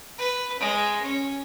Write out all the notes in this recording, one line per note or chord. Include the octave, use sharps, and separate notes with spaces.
B4
G#3
C#4